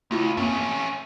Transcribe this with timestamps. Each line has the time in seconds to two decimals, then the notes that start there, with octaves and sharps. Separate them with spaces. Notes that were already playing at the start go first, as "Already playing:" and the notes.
0.11 C#2 A3 E4 F4
0.37 F#2 A3 A#3 C4 C#4